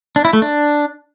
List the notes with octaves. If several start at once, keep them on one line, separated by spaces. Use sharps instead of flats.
D4
E4
A3
D4